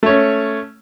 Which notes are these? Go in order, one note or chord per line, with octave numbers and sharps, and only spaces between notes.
A3 C#4 C#5